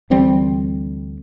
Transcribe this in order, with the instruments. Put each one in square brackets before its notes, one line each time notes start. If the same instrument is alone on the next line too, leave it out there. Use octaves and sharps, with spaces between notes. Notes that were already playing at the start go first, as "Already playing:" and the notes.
[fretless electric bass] D2 E3 G3 C4